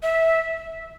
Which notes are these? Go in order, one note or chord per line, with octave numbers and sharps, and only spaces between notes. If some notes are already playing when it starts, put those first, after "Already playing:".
E5